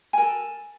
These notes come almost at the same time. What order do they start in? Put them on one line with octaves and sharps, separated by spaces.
G#5 A#4 A4